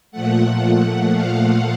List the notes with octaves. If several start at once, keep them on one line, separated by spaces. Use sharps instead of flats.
A#2 F3 A3 F#5
F5